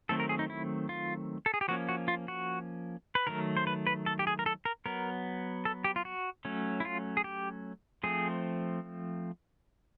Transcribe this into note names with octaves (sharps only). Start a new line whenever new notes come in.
D#3 F#3 A3 C4 A4
A#4
G#4
D#4
E4
F4
A4
G#4
G4
F3 A#3 C#4 F#4
F#4
F4
F#4
B4
D#3 F#3 A3 A#4
C5
B4
B4
A4
G4
G#4
A#4
A4
A#4
F#3 B3 A#4
A4
G4
F4
F#4
F#3 A3 C#4
E4
F4
G#4
G4
F3 A3 C4 G#4